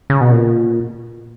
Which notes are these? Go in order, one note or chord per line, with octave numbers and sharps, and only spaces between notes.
C#3
B2
A#2